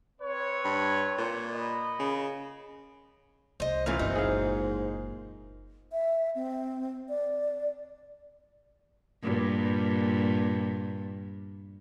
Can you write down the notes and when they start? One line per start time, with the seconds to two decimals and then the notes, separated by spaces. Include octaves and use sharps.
0.21 C4 B4 C#5
0.65 G2
1.18 A#2
1.53 D#5 B5
2.00 C#3
3.60 C2 C5 D#5
3.86 A1 A#2 E3 A#3 C#4 F4 F5
3.99 F#1 C3 D#4 C5 F#5
4.15 G#2 G#4 F5
5.92 E5
6.35 C4
7.09 D5
9.23 G2 A#2